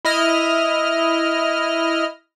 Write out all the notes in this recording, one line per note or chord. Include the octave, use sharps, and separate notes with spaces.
E4 D#5 F6